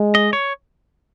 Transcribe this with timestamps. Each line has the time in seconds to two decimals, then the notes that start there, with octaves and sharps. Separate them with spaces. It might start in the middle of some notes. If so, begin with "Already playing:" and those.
Already playing: G#3
0.15 D#5
0.33 C#5